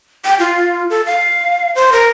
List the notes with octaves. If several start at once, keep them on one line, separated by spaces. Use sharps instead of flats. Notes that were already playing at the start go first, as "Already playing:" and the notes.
G5
F4
A4
F5
C5
A#4